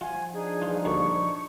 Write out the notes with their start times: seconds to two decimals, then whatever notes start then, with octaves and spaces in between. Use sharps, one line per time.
0.01 F3 F4 F#5 G#5
0.34 D4 D#4 G#4
0.62 E3 F4
0.85 D2 A#2 G3 C#6